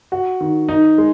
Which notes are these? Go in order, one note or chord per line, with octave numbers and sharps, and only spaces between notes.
F#4
D#3
D#4
G#3